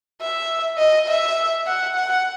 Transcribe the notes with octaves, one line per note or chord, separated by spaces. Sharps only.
E5
D#5
E5
F#5
F#5